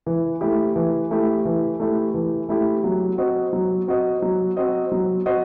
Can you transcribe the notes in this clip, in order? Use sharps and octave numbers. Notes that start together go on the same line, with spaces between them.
E3
A3 E4 G4
E3
A3 E4 G4
E3
A3 E4 G4
E3
A3 E4 G4
F#3
C4 F#4 C5 D#5
F#3
C4 F#4 C5 D#5
F#3
C4 F#4 C5 D#5
F#3
C4 F#4 C5 D#5